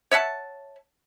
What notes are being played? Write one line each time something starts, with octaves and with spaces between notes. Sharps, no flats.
C#5 E5 F#5 A5